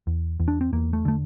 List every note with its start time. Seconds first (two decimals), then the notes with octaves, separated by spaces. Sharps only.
0.07 E2
0.40 E2
0.48 D4
0.61 C4
0.73 E2 A#3
0.93 A3
1.05 D3 A3